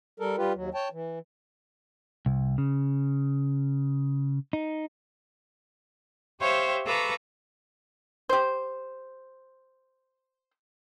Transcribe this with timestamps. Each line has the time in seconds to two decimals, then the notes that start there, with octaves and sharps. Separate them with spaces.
0.20 G3 A4 A#4
0.38 G3 F4 G4 B4
0.54 D#2 F#3
0.74 C#5 G5 A5
0.92 E3
2.26 C2
2.58 C#3
4.53 D#4
6.41 G4 C5 C#5 E5 F5 G5
6.86 A4 B4 F5 A#5 C#6 D6
8.29 G4 C5